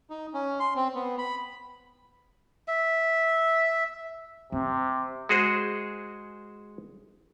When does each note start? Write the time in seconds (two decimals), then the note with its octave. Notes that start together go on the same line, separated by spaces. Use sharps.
0.10 D#4
0.34 C#4
0.60 C6
0.76 C4
0.95 B3
1.18 B5
2.68 E5
4.52 C3 C4
5.29 G#3 F#4 G#4 C5